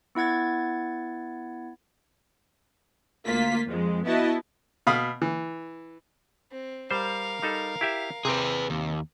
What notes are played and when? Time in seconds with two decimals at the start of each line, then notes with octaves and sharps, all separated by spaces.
0.15 B3 E4 F#5 G#6 A6
3.26 D2 A#3 F4 B6
3.66 F2 G#3
4.06 B3 E4 F#4 D#5 A5
4.87 B2 F5 B5 D#6
5.22 E3
6.52 C4
6.91 G3 A#4 C5 F5
7.42 G3 D#4 A4
7.81 E4 G4 E5
8.25 C3 C4 G#4 B4 G5
8.70 D#2